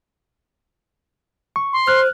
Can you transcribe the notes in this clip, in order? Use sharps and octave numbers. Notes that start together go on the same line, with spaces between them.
C#6
C6
C5 F6 F#6